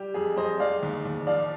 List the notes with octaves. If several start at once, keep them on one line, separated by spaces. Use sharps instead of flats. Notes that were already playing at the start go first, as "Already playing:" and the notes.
Already playing: G3 G4
F2 G#4
F2 C5 D#5
G#3 D5 F5
D#2
D#2
F3 D5 F5